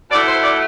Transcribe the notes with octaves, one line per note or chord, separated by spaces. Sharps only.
B2 A3 E4 D5
C5
D5